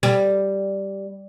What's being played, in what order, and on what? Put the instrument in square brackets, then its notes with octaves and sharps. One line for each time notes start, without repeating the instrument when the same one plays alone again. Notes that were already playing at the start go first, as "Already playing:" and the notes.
[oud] G3